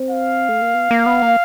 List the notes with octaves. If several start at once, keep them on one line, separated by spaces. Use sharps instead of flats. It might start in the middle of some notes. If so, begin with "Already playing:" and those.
Already playing: C4
F5
A3
A#3
B3
A#3
B3
A#3